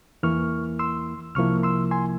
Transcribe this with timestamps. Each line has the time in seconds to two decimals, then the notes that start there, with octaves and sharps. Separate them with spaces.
0.23 E2 E3 A#3 E4 C#6 F6
0.79 C6 E6
1.35 C2 C3 F3 A#3 E4 C#6 F6
1.63 C6 E6
1.91 G#5 C6